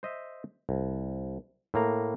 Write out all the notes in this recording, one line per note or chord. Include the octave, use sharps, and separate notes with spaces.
C5 D#5 E5
C2
A2 A#3 A#5